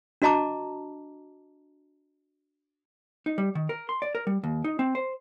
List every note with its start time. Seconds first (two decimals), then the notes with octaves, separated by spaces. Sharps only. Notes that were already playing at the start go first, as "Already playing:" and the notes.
0.22 D4 F#4 D#5 A5 A#5 D6
3.26 D#4
3.38 G3
3.55 D#3
3.69 A#4
3.89 C6
4.02 D5
4.15 A#4
4.27 G3
4.44 D#2
4.64 D#4
4.79 C4
4.95 C5